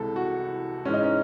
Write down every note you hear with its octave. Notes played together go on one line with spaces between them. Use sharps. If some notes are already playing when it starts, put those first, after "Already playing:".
Already playing: C2 C3 E3 G#3 A4
F#4
G#2 E3 G#3 C#4
D#4
C#4